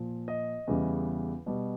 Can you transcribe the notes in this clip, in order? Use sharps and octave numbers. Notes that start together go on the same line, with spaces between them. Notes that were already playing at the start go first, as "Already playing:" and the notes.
Already playing: A#2 F3
D#5
E2 C#3 E3 G3
B2 G3